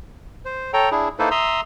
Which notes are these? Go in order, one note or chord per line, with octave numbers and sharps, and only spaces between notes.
C5
A4 C#5 G5 A#5
D4 E4 G#4
A#3 D#4 E4 A4 B4 C5
E5 A#5 C6 D#6 E6